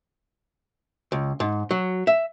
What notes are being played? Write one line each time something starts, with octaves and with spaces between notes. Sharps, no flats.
C#2
G#2
F#3
E5